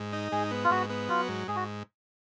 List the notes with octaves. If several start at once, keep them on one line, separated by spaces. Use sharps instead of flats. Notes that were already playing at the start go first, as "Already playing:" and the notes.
Already playing: G#2
D#4
G#2 G#4
B3
F4
G#2 F#4
B3
F#3 F4
G#2
G#2 G#4
F#4